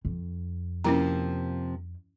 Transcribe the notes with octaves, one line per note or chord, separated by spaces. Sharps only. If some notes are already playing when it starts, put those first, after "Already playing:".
F2
C3 F3 A#3 C#4 E4 A#5